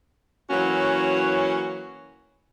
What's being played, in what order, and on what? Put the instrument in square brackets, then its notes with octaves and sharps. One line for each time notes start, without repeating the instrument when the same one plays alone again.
[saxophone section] E3 F#3 A#3 C#4 F#4